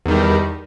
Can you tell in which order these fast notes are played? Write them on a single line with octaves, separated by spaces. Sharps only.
E2 D#3 G3